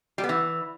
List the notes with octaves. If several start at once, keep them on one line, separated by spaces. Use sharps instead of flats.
G3
B3
E3